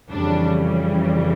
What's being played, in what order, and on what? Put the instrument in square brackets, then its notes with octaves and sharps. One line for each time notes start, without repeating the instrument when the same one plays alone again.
[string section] F2 C#3 E3 G3 D4